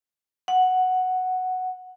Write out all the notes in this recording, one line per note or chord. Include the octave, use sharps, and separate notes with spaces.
F#5